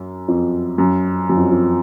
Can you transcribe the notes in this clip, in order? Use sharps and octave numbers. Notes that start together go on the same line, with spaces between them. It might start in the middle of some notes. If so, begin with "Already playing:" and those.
Already playing: F#2
F2
F#2
F#2
F2
F2